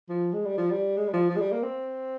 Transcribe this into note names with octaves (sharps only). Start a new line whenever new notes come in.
F3
G#3
G3
F3
G3
G#3
G3
F3
F3
G#3
G3
A#3
C4